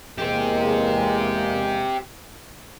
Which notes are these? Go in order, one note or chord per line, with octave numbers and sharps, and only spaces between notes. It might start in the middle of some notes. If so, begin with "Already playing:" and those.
E2 G#3 A#3 G4 C5